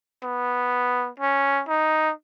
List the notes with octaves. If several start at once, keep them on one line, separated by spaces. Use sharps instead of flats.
B3
C#4
D#4